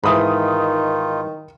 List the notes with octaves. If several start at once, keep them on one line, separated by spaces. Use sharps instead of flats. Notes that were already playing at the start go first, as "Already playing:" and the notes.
G#2 D#3 E3 D#4 F4 B5 D#6